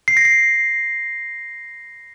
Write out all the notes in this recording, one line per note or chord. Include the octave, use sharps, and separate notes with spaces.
C7
A#6
C7